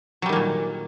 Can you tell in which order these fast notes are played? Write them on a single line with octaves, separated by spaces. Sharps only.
F#3 G3 D#3 A#3 A#2